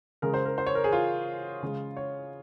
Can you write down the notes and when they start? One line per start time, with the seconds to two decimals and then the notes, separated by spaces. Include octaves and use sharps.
0.22 C#3 G#3 A#4
0.34 C5
0.45 A#4
0.58 C5
0.67 C#5
0.75 A#4
0.84 G#4
0.92 F4
1.63 C#3 G#3
1.97 C#5